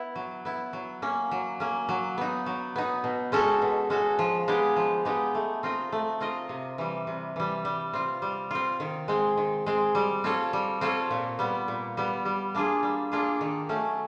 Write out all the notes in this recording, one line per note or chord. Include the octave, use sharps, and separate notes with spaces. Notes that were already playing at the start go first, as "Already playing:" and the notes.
Already playing: B3 E4
F#3
B3 E4
F#3
A#3 C#4
F#3
A#3 C#4
F#3
B3 D#4
F#3
B3 D#4
B2
G#3 C#4 F#4 A4
B2
G#3 C#4 F#4 A4
F3
G#3 B3 D#4 G4
F3
G#3 B3 D#4 G4
A3
C4 F4 A#4 D#5
A3
C4 F4 A#4 D#5
C3
E3 G3
C3
E3 G3
G3
C4 F4
G3
C4 F4
D#3
G#3 C4
D#3
G#3 C4
G3
C4 F4 A4 C#5
G3
C4 F4 A4 C#5
A#2
G3 B3
A#2
G3 B3
G3
A#3 D4 F4 G#4
G3
A#3 D4 F4 G#4
D#3
F#3 A3 C#4